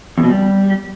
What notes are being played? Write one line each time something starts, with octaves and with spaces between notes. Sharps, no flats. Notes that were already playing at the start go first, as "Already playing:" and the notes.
E2
B2
G3